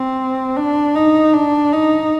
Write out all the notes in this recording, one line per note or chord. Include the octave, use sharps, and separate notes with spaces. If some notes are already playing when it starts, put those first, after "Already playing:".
Already playing: C4
D4
D#4
D4
D#4